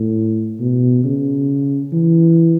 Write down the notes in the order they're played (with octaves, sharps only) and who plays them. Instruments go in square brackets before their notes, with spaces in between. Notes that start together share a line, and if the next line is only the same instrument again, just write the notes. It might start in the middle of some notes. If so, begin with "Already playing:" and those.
Already playing: [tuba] A2
B2
C#3
E3